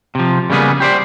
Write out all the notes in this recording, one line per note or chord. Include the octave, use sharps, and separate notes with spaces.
C3 F3
C#3 G3 A#3 B3 G#4
G4 C5 D5